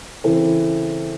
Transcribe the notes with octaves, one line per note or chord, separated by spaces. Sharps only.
C#3 E3 C4 E4 A4